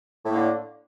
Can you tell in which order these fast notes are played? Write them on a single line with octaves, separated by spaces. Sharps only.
A2 A#3 D3